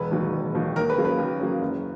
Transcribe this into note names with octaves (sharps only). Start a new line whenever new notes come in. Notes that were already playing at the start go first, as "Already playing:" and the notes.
Already playing: E1 B4
D#2 D#3 F#3
E1
D#2 D#3 F#3
D#2 A#4
B4
C#3 F#3 A#3
B4
D#2
C#3 F#3 A#3
F#1